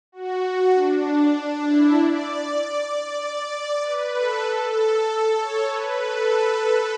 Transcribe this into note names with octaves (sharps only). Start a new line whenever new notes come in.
F#4
D4
E4
D5
D5
D5
D5
B4
A4
A4
C#5
B4
A4